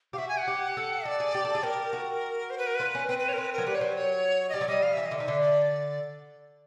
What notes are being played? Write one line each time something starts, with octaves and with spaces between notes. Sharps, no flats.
G4 F5
F#4 E5
G#5
F#5
G4
A4
A4 D5
G#4
G4
A4
G#4
G4 A#4
F#4
C5
B4
A#4
F4 B4
C#4
C4 B4
B4
C#5
A#4
C4 B4
A#4
F#3
G3 B4
C#5
F#3 C5
C#5
D#5
G3 D5
F#3
G3 D#5
F3 F5
E3 E5
D#5
D3
D#3 E5
D3
D5